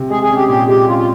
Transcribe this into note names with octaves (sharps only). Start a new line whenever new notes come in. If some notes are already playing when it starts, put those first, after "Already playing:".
Already playing: C3
G#3 G#4
G#4
C#4
G4
A#2 G4
G#3 G4
C#4 F4
F4